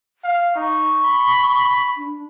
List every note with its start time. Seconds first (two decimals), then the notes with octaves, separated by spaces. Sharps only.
0.24 F5
0.55 D#4 C#6
1.04 B5
1.97 D4